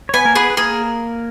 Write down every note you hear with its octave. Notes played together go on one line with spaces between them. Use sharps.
C#5
B3 B4 G#5
A#3 A#4
B3 G#4 B4
B4
A#3 G#4 A#4